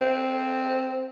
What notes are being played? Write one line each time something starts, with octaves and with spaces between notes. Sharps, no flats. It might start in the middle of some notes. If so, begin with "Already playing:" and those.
C4